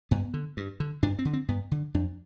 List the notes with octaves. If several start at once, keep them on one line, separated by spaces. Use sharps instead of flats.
G2 B3
D3
G2
D3
G2 D4
C4
D3
C4
G2 B3
D3
F2 D4